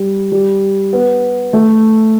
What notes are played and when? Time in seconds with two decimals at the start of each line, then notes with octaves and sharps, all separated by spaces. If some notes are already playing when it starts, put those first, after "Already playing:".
Already playing: G3
0.32 G3
0.93 B3
1.53 A3